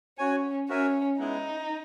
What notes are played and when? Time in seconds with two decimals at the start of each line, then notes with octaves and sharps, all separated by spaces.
0.18 C#4 F#4 C#5 G#5
0.69 C#4 F#4 A#4 E5 G#5
1.20 G#3 B3 D#4 E4